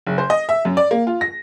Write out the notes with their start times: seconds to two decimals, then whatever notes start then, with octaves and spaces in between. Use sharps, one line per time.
0.07 F#1
0.18 C5
0.30 D#5
0.49 E5
0.65 F#2
0.77 D5
0.91 A#3
1.07 F4
1.21 A#6